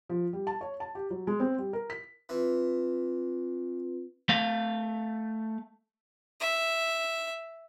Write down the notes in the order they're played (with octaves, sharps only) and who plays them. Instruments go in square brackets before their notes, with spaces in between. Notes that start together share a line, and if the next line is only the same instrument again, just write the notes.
[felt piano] F3
G3
A5
C#5
A5
G4
F#3
G#3
C4
G3
A#4
B6
[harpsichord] E3 [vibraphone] C4 F4 B4
[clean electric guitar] A3 F5
[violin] E5